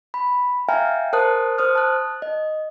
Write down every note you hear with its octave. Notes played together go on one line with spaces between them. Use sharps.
B5
E5 F5 G5 G#5 A#5 F6
A#4 C5 A5 D#6 F#6
C5 D#6 F6
A5 F#6
D#5